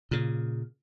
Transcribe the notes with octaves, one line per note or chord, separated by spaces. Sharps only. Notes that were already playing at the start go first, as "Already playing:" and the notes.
A#2 C#3